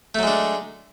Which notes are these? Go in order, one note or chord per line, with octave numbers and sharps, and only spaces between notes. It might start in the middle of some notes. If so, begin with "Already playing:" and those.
F#3 G#3 A3 D4